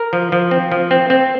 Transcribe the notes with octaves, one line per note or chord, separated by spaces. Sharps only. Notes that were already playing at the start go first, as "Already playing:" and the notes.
Already playing: A#4
F3
F3
C4
F3
C4
C4